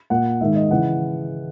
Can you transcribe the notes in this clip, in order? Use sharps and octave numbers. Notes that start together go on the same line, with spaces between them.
A#2 F#5
G#2 D#3 E5
D#5
C#3 E3 F#5